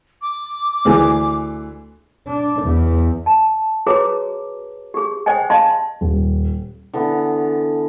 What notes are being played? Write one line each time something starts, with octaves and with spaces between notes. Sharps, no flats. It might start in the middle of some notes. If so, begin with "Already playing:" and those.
D6
D2 E3 G#4
D4
E2
A5
F#4 G#4 B4 C#5 A#5 D6
G4 G#4
C5 D#5 G5 G#5
D#5 F5 A5 C6
D#1
D3 E3 B3